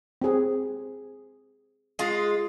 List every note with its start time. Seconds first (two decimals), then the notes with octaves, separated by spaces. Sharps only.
0.22 C4 G#4
1.99 G#3 F4